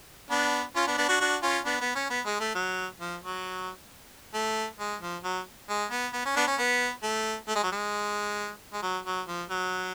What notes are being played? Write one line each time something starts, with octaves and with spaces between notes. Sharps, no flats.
B3 D4
C#4 F4
B3 D4
B3 D4
D4 F#4
D4 F#4
C#4 F4
B3 D4
B3
C#4
B3
G#3
A3
F#3
F3
F#3
A3
G#3
F3
F#3
G#3
B3
B3
C#4
B3 D4
C#4
B3
A3
A3
G#3
F#3
G#3
G#3
F#3
F#3
F3
F#3